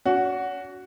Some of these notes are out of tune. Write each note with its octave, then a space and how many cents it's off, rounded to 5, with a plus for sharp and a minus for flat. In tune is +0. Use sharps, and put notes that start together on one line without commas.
C#4 +45 F#4 +0